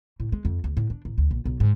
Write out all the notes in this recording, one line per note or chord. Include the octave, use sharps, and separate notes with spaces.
A2
G#3
F2
D2
A2
D4
A1
D2
A#1
B1
G#2